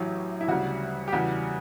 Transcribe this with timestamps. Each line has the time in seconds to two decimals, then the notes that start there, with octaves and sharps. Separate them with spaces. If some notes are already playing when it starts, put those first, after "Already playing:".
Already playing: A1 A2 F#3 G4
0.41 E4
0.48 D2 C#3 G3 F#4
1.08 G4
1.12 E2 C#3 G3 F#4